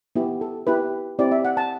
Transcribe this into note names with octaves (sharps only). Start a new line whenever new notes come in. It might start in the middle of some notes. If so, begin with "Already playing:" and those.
B3 E4 G4
A4
B3 E4 G4 B4
C4 E4 G4 D5
E5
F#5
A5